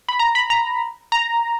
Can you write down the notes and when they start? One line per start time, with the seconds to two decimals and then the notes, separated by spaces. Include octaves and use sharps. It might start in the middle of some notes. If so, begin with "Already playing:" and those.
0.08 B5
0.19 A#5
0.35 B5
0.50 A#5
1.12 A#5